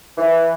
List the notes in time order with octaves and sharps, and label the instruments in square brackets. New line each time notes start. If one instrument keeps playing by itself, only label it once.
[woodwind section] E3